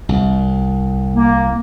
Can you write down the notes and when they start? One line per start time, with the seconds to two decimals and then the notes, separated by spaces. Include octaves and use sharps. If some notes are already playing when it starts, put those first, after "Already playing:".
0.09 C2
1.15 A#3